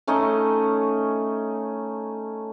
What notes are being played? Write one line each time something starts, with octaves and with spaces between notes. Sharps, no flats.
A3 C#4 D#4 D#5